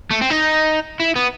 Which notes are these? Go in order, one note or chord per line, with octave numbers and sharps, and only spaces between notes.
A3
C4
D#4
E4
B3